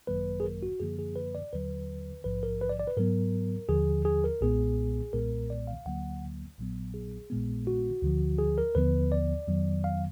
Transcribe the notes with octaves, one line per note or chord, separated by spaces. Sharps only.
G#1 F#2 D#3 F#3 A#3 B4
G#4
A#4
F#4
F#2 D3 F3 A#3 G#4
G#4
B4
D5
D#2 D3 F#3 B4
A#1 G#2 F3 B4
A#4
B4
D5
D5
B4
G#2 F#3 B3 A#4
D#2 D3 F3 G#4
G#4
A#4
B1 A#2 G#3 B3 G#4
B1 A#2 G#3 B3 A#4
D5
F5
D2 D3 F#3 A#3 F#5
A#1 A#2 F#3 B3
G#4
A#1 A#2 G#3 B3
F#4
D2 D3 F3
G#4
A#4
D#2 D3 F3 B3 B4
D5
F2 D#3 F#3 B3
F5